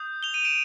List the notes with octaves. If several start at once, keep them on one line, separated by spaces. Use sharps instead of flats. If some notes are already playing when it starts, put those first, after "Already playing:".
Already playing: D#6 G6
F7 G7
D#7 F7
D7 E7